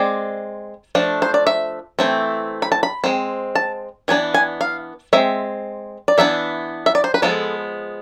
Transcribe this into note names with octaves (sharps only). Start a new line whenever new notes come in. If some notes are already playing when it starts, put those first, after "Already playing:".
Already playing: G#3 C4 D5
F3 A3 D4
C5
D5
E5
E3 A3 C4
B5
A5
B5
G#3 C4
A5
E3 B3 D4 G#5
G#5
F5
G#3 C4 E5
D5
E3 B3 D4 E5
E5
D5
C5
B4
F3 G#3 B3 A4